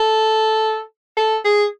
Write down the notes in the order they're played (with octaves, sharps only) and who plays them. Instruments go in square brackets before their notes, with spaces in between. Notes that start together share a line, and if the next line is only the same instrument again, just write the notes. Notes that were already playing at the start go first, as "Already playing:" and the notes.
Already playing: [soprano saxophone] A4
A4
G#4